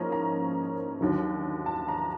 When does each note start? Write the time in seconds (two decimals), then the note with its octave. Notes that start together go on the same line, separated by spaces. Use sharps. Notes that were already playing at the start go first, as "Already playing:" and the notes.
Already playing: G#2 F3 A#3 C#4 A#5
0.12 A#5
1.01 D#2 D3 F#3
1.66 A5
1.88 A#5